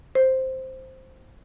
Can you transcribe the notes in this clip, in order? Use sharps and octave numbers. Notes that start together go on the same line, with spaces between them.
C5